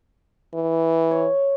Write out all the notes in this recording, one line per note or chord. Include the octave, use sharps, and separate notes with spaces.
E3
C#5